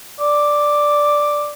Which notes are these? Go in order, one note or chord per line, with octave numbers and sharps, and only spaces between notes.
D5